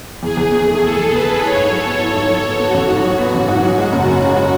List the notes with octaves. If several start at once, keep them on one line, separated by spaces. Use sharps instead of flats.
E2 G#4
E2
B2
A3
E2 A4
E2
B2 B4
A3
E4 C#5
G#2
F#3 A4
B3
E4 A4
G#2
F#3
B3
B3 F#4
A1
G#2 F#4
F#3
B3 F#4
A1
G#2
F#3
G#3 F#4
F#1
F#2
C#3
G#3